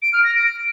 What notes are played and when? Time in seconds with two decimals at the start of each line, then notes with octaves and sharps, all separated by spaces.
0.02 D7
0.13 F6
0.24 A#6
0.35 D7